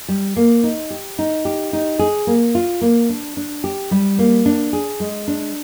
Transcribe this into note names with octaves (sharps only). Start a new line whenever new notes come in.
G3
A#3
D#4
G4
D#4
G4
D#4
G#4
A#3
F4
A#3
D4
D4
G4
G3
A#3
D4
G#4
G#3
D4